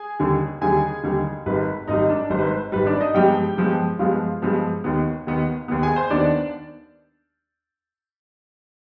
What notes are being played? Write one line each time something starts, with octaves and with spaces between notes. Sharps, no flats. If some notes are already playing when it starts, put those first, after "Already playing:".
Already playing: G#4 G#5
D#2 D3 G3
D#2 D3 G3 G#4 G#5
D#2 D3 G3
G#1 G#2 G3 B4
G#1 G#2 G3 D#4 D#5
D4 D5
G#1 G#2 G3 C5
B4
C5
G#1 G#2 G3 B4
D4 D5
D#4 D#5
G2 F3 G#3 B3 G4 G5
G2 F3 G#3 B3
G2 F3 G#3 B3 F4 F5
G2 F3 G#3 B3
D#2 D#3 B3
D#2 D#3 B3
D#2 D#3 B3
G#4 G#5
C5
D#2 D#3 B3 D4 D5